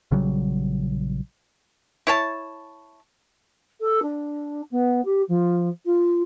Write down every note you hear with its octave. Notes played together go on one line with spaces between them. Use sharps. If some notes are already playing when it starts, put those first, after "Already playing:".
A#1 C#3 F#3 G3
E4 C#5 A5
A4
D4
B3
G4
F3
F4